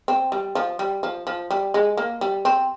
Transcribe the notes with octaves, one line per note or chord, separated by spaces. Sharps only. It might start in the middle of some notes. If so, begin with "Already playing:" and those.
C4
G3
F3
G3
F3
F3
G3
G#3
A#3
G3
C4